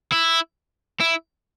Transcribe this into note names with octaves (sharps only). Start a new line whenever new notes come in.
E4
E4